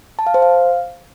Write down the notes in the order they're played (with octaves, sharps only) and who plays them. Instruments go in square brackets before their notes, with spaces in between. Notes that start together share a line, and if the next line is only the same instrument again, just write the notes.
[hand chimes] A5
F5
C5
F5